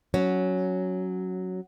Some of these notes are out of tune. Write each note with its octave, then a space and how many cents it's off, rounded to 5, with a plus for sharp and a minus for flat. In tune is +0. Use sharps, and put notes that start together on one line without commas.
F#3 +0 C#4 +0